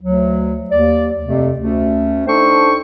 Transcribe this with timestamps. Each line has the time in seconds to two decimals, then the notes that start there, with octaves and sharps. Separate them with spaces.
0.02 D2 F#3
0.70 D#2 D5
1.25 F2 C3 A3
1.58 D2 A3 C#4
2.27 D4 D#4 A4 C5 G5 C#6